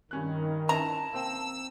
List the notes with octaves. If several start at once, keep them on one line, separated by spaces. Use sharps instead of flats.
G2 D#3 C#4 F#6
C#4 E4 A5 A#5
A#3 C4 G5 E6